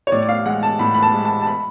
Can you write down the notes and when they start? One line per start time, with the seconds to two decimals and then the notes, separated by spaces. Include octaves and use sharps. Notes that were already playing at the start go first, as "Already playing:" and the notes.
0.07 C#5
0.12 A2 D5
0.22 D5
0.29 F5
0.46 G#3 F#5
0.63 A5
0.79 A2 B5
0.94 B5
1.03 A5
1.14 G#3
1.25 A5
1.42 A5
1.47 B5